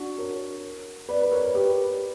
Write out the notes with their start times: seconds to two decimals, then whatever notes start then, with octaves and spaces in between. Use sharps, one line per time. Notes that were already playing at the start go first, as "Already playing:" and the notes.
Already playing: D4 F#4
0.18 A#4 C#5
1.09 B4 D5
1.22 B4
1.31 A#4 C#5
1.54 G4 B4